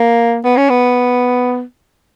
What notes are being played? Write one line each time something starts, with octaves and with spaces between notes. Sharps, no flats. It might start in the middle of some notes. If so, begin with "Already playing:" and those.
Already playing: A#3
B3
C#4
B3